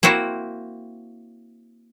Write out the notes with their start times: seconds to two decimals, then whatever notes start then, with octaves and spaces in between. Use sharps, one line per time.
0.03 A#3 C4 E4 F#4